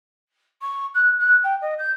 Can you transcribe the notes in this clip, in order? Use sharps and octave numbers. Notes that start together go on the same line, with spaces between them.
C#6
F#6
F#6
G5
D#5
G6